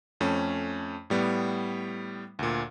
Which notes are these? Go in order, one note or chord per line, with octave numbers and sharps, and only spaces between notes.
F2 A3 C#4
A2 G3 B3
D2 A#2